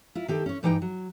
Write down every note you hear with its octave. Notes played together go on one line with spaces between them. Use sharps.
E4 F4
D#3 G4 A4
C#4 C#5
G2 E3 D#4 G5
F#3